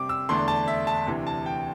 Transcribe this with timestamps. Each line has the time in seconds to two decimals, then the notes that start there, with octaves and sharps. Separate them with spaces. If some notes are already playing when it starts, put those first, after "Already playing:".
Already playing: C3 G3 C4 D6
0.09 E6
0.29 E2 D3 A3 D4 C6
0.48 A5
0.68 E5
0.87 A5
1.07 D2 C3 E3
1.27 A5
1.46 G5